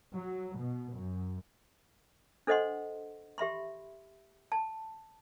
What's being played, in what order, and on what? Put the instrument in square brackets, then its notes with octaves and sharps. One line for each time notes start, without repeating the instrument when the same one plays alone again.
[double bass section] F#3
B2
F#2
[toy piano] D4 A4 C5 D#5 F#5 C6
G4 E5 B5 C6
A5